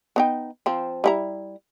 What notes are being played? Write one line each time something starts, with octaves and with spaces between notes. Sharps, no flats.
B3 D#4 G5
F3 C4
G3 E4 A#5